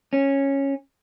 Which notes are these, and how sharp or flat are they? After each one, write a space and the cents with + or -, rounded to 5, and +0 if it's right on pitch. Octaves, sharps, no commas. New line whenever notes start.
C#4 -10